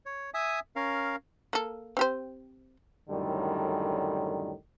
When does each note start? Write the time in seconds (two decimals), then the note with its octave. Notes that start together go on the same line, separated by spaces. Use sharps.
0.06 C#5
0.34 E5 G#5 D#6
0.76 C#4 A#4 F5
1.53 A#3 A4
1.97 C4 G4 C5
3.09 F#2 A2 D3 D#3 G3